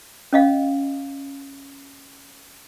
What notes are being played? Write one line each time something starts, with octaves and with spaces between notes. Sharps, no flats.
C#4 D#5 F5